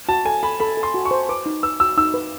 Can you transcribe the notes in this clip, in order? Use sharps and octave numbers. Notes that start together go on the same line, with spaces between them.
F#4 A5
A4 G#5
A4 B5
A4 B5
A4
C6
F#4
C#6
C5
B4 D6
D#4
B4 E6
F#4 E6
D#4 E6
B4